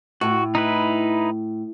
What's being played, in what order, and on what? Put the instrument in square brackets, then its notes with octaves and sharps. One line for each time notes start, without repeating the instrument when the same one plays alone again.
[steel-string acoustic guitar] A2 [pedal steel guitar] F#4
[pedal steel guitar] D#4 E4 B4